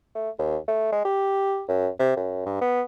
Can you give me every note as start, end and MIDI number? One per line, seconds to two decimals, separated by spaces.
0.15 0.30 57
0.39 0.57 39
0.68 0.89 57
0.92 1.01 56
1.05 1.63 67
1.68 1.88 42
1.99 2.12 48
2.17 2.43 42
2.46 2.56 43
2.61 2.82 59